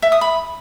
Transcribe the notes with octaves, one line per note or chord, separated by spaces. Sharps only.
E5
D#6
B5